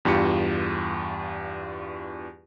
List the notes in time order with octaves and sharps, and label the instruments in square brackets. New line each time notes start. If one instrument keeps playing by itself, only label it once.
[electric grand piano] E2 G2 F4 G4 C#7